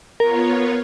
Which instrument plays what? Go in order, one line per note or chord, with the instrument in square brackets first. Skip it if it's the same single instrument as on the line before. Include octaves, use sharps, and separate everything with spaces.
[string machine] B3 F4 C#5 [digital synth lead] A#4